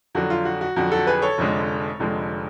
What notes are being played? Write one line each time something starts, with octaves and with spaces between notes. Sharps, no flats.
F2 D3 F#3 F#4
F4
F#4
F#4
F2 D3 F#3 F#4
F#4 A4
G#4 B4
A4 C#5
F1 F2 D3 G#3
F1 F2 D3 G#3